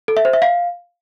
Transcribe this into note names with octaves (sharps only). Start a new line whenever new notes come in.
A4
E5
C5
E5
F5